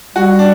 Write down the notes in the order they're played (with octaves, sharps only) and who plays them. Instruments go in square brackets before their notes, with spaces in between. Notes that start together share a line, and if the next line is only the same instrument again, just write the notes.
[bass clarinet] G3 [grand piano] F#4
[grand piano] D4